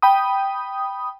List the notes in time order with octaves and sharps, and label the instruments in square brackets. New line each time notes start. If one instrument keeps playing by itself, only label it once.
[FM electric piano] G5 B5 D#6